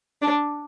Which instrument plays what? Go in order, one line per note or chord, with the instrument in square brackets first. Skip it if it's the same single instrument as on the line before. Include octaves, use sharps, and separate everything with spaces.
[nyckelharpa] D4